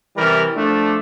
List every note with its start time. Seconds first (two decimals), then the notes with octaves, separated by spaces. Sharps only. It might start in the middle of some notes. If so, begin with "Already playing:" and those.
0.16 C3 E3 G3 A#4
0.55 F3 A3 D4